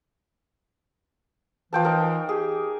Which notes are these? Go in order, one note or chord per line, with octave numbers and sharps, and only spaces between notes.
E3 F3 G5 A5
D#4 A#4
G4 G#4